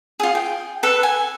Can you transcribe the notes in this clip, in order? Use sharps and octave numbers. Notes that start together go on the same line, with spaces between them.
F4 G#4
G5
A4 B4
G#5